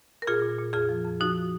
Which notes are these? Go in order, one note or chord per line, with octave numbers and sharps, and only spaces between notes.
A#4
A#2 F4 G#4
A#2
A#2
F2 F4 G#4
F3
F2
F3 D#4 F#4